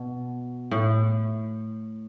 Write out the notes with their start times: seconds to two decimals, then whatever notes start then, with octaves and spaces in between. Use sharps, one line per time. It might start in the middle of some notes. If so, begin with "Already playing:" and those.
Already playing: B2
0.71 A2